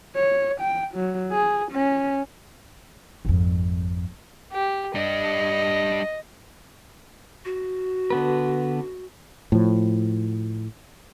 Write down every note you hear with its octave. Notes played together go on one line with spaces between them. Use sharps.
C#5
G5
F#3
G#4
C#4
G#1 F2
G4
G3 D4 D#5
F#4
D3 B3 B4
A2 F3